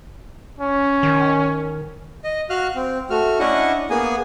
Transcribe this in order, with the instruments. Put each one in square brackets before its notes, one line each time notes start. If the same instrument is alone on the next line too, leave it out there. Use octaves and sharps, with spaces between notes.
[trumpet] C#4
[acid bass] D#3
[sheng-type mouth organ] D#5
F#4 F5 F6 F#6
C4
A3 F#4 F6
C#4 D4 E4 D#5 F#5 C#6
A#3 B3 G#4 G#5